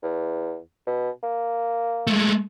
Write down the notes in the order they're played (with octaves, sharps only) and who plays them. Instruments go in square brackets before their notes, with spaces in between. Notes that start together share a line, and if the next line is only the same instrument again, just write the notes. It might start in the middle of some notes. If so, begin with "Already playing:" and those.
[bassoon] E2
B2
A#3
[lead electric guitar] G#3 A3